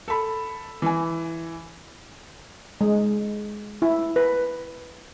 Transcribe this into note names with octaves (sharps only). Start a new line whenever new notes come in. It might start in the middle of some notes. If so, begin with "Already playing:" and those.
A4 B5
E3 G#5
G#3
E4
B4